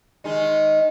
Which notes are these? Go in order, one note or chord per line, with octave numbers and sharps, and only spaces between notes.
D#3 G#3 D#4